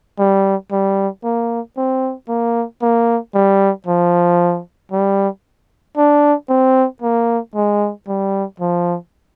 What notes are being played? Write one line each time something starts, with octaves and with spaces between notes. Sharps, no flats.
G3
G3
A#3
C4
A#3
A#3
G3
F3
G3
D4
C4
A#3
G#3
G3
F3